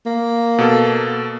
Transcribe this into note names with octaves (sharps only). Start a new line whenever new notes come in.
A#3
B2 A4